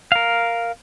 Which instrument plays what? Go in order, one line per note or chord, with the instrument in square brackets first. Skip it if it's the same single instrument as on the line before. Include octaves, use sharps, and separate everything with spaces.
[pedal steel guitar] A#4 F5